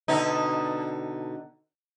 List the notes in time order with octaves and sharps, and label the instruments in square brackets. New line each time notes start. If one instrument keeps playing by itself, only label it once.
[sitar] B2 D3 D#4